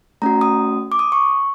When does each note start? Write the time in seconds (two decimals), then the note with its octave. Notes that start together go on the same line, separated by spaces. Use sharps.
0.22 A3 C#4 F#4 A#5
0.41 D#6
0.92 D6
0.99 D#6
1.12 C#6